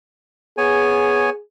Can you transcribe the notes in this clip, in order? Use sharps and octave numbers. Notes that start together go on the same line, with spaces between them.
B3 G#4 C#5 G#5